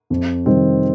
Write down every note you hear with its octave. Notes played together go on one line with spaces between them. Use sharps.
F2
C3 D#3 G3 C4